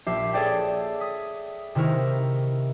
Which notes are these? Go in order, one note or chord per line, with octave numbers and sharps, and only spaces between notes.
A#1 G4 E5 D6 C7
G#4 A4 C#5 D5 G5
D#6 B6
C3 D#3 E4 A#4 C#6